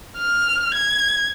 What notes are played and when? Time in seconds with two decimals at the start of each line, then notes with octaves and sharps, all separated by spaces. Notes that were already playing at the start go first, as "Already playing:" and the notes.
0.18 F6
0.75 G#6